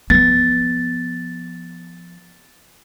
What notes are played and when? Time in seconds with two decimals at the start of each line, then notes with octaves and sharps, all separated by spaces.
0.10 F3 B3 A6